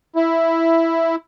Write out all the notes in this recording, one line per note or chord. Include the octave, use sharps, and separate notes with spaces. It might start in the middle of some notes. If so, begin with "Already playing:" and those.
E4